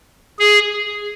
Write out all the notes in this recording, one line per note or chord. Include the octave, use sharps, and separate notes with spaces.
G#4